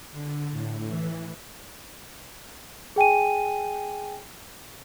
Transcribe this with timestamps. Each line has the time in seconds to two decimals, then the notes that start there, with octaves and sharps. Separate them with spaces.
0.11 D3
0.51 A2
0.88 E3
2.96 G#4 G5 G#5 D#7